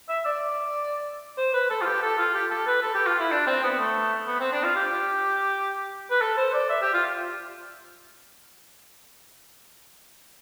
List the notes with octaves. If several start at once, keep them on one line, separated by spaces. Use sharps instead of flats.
E5
D5
C5
B4
A4
F4
G4
A4
F4
G4
A4
B4
A4
G4
F4
E4
D4
C4
B3
A3
B3
C4
D4
F4
G4
B4
A4
C5
D5
E5
G4
F4